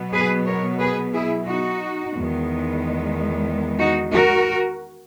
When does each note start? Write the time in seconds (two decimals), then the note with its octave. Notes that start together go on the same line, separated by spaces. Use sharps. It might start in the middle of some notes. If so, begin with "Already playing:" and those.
Already playing: B2 F#3 B3
0.13 G#4 B4
0.46 A#4 C#5
0.79 G#4 B4
1.13 E4 G#4
1.46 D#4 F#4
2.13 E2 D#3 G#3 B3
3.79 D#4 F#4
4.12 F#4 A#4